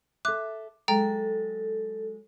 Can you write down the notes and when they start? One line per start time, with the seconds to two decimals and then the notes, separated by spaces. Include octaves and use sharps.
0.25 A4 E5 D6 F#6
0.88 F#3 G#3 A4 G5 A#5